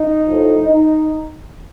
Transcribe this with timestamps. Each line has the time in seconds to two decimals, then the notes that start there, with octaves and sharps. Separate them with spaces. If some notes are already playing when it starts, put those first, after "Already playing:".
Already playing: D#4
0.26 A2 F3
0.66 D#4